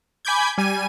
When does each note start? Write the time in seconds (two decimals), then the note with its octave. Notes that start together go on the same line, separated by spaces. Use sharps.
0.25 G#5 B5 D6 G6 G#6
0.58 G3 G#5 D#7